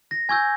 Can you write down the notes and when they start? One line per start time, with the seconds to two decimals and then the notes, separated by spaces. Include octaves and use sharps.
0.11 A#6
0.29 G#5 C#6 E6 G6 G#6